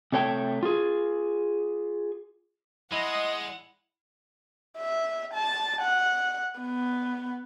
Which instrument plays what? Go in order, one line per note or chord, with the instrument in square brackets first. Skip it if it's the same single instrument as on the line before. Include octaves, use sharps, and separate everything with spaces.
[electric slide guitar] C3 A3 C#5 G5 A5
F4 G#4
[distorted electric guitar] G#3 [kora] E4 [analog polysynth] D#5 C6 D#6 [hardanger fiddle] F#5
[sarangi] E5
A5
F#5
B3